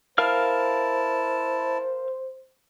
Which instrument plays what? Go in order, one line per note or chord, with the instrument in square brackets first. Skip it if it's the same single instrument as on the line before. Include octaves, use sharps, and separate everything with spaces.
[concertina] E4 A5 [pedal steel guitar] A#4 F5 F6 [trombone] C5